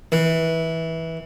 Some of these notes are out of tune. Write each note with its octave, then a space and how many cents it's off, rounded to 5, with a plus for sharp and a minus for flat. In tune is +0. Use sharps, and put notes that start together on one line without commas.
E3 -15